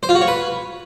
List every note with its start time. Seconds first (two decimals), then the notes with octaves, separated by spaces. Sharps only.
0.03 C5
0.09 F4
0.15 F#4
0.21 C#5
0.27 B4